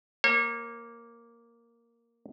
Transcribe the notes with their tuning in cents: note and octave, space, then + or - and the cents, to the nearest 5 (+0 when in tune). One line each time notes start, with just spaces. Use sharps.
A#3 +0 C#5 -35